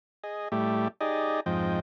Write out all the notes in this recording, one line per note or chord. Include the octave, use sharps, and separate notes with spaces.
G#4 D#5
A2 G3 A3 G4
D#4 G4 G#4 D5 D#5
F2 G#2 F3 D#5 G5